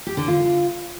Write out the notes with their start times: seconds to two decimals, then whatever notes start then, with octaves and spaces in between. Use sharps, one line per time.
0.07 G4
0.17 D3
0.28 F4